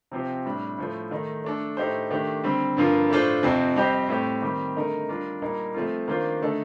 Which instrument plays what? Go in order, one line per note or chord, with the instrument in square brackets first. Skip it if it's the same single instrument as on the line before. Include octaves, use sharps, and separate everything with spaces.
[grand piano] C3 F3 C4 G4
A2 G3 D4
A2 F3 A3
D#3 A3 D#4
A3 D4 A4
A2 A3 D#4 G4 C5
D#3 A3 D4 G4
D3 G3 C4
G2 D3 F3 A#3 F4
A2 A3 D4 F4 C5
F2 C3 F3 C4
G3 C4 G4 C5 D#5
A2 A3 C4 G4
D#3 G3 C4 G4
D3 A3 D#4 A#4 D#5
G3 D4 F4 A#4
A#2 G3 A#3 D#4
F3 A3 C4 F4
D#3 A#3 D4 F4 C5
D3 A3 D#4 A4